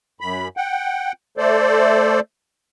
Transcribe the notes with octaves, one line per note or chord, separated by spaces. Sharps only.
F#2 B5
F#5 G5
A3 A4 C5 D5